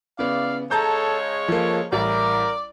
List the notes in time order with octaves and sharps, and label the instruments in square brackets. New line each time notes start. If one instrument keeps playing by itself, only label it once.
[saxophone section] E2 D5 [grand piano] C#3 B3 [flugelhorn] F5
[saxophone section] C#3 G#3 C#5 [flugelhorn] A4 [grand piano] A5 A#5 G6
[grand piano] F3 A#3 [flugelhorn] A4
[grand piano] A1 G3 E4 [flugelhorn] A#4 [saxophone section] D5